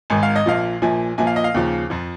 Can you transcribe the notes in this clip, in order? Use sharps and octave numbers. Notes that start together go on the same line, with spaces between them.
G#1 G#2 D#3 G#5
F5
D#5
A#1 A#2 F3 F5
A#1 A#2 F3 G#5
A#1 A#2 F3 G#5
F5
D#5
F5
D#2 C#3 F3
F2 F3